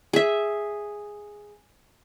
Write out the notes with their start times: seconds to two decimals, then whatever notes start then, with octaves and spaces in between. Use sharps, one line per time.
0.13 G#4 E5